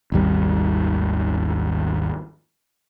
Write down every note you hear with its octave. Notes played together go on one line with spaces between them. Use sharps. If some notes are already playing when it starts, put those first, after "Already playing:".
G#1 D#2 G3